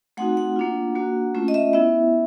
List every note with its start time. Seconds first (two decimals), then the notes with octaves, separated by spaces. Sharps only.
0.17 A3 C4 D#4 F#4 F#5
0.37 F#5
0.56 A#3 D4 F4
0.95 A#3 D4 F#4
1.35 A3 C#4 F4
1.48 D#5
1.54 E5
1.73 B3 E4 E5